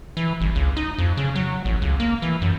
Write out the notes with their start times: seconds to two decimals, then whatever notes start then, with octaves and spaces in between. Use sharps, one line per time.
0.17 E3
0.41 G1
0.55 C#2
0.77 D#4
0.98 F2
1.17 C#3
1.35 F#3
1.65 A1
1.82 C#2
2.00 A#3
2.22 E3
2.42 F#2